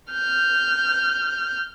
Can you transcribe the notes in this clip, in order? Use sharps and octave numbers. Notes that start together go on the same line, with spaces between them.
F6 G6